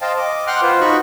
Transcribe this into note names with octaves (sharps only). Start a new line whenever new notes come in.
C5 D#5 F5 G5 A5
D#5 D6
F#5 G5 C6 D6 F6 F#6
F4 B4 C5
D#4 F#4 B5 C#6